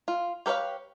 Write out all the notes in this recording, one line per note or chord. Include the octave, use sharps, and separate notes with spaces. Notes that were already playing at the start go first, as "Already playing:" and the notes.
F4
G4 A#4 B4 C#5 F5